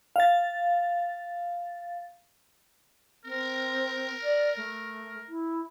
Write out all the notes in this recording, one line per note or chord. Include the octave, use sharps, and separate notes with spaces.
F5 A6
C4 A#4
D5
A3
E4